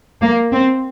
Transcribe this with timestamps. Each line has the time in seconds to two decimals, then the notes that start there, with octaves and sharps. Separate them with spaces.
0.22 A#3
0.53 C4